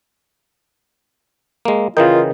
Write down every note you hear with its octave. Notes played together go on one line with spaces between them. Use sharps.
G#3 A#3
C#3 E3 F4 A#4 D#5 G5